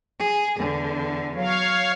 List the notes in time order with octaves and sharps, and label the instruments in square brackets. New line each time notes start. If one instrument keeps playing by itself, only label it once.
[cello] G#4
E2 D3
[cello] F#3 [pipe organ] C#5 F5